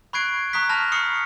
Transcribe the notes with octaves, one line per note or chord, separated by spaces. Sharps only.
B5 C#6 F#6 G#6 C7 D7
A#5 C#6 D#6 F#6 B6
A5 B5 F6 G6 A#6 F7
B5 C#6 D#6 F6 C7 C#7